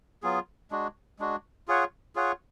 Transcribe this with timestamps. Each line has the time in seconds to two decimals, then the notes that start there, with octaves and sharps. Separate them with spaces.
0.22 F#3 B3 F4 G#4
0.71 G#3 D4 F#4
1.19 G#3 D4 F#4
1.68 F4 G#4 C#5 F#5
2.15 F4 G#4 C#5 F#5